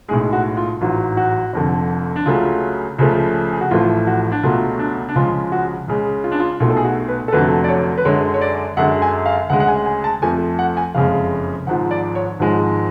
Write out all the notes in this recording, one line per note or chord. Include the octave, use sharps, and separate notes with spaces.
B1 A2 G#3 G#4
F#4
F4
A1 G#2 F#3 F4
F#4
F1 F2 D3
D4
C#2 C#3 F#3 A3 F4
C#2 C#3 F3 A3
G#4
F#4
A1 A2 F3 A3 F4
F#4
D4
C#2 B2 F#3 A3 F4
D4
D4
C#2 C#3 F3 G#3 F4
F#4
C#2 C#3 G#3
F4
D4
F4
B1 B2 A3 F4
A4
G#4
F#4
B4
A4
F1 F2 D3 F#3 A3 B4
D5
C#5
B4
F#2 D3 G#3 C#5
C#5
D5
F#2 D3 G#3 F#5
G#5
F5
D2 C#3 G#3 F#5
F#5
G#5
G#5
A5
F2 F3 A3 G#5
F#5
G#5
F#1 F2 C#3 G#3 F5
G#1 G#2 F3 F#5
D5
C#5
G#1 G#2 F3 G#3